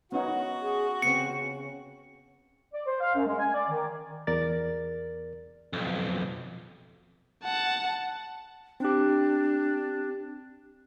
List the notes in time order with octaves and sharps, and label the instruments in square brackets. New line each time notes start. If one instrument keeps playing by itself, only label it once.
[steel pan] B3 C#4 D#4 [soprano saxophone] F#4 [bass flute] F#5
[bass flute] G#4
[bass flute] C#3 [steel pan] B3 C4 [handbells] C#7
[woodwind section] D5
C5
F5
F#2
G#3
G#5
D5
D#3
[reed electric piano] E2 A#4 D5 A6
[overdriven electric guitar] B1 F2
[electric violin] F#5 A5
[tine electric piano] C4 G4 [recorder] D4